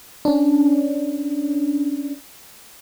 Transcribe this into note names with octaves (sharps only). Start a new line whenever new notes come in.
C#4 D4